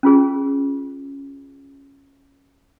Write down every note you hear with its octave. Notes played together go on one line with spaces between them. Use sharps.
C#4 F4 G#4